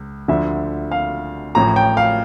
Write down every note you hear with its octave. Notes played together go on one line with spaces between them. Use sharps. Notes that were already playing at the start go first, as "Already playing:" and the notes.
Already playing: C#2
D2 D3 F3 E5
F5
A1 A2 F3 A#5
G5
F5